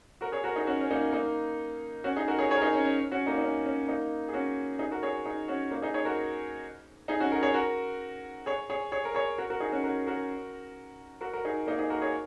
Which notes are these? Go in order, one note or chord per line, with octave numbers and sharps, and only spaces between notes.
F#4 A#4
G#4 C#5
F#4 A#4
D#4 G#4
C#4 F#4
C#4
A#3 D#4
A#3 D#4
C#4 F#4
D#4 G#4
F#4 A#4
G#4 C#5
G#4 C#5
A#4
D#4 G#4
C#4
C#4
C#4 F#4
A#3 D#4
D#4
C#4
C#4
A#3 D#4
G#4
C#4 F#4
D#4 G#4
F#4 A#4
G#4 C#5
D#4 G#4
C#4 F#4
A#3 D#4
D#4 G#4
G#4 C#5
F#4 A#4
D#4 G#4
C#4 F#4
F#4 A#4
G#4 C#5
F#4 A#4
G#4 C#5
G#4 C#5
G#4 C#5
A#4
G#4 C#5
F#4 A#4
F#4 A#4
D#4 G#4
C#4 F#4
F#4 A#4
F#4 A#4
F#4 A#4
F#4 A#4
D#4 G#4
A#3 D#4
D#4 G#4
F#4 A#4
G#4 C#5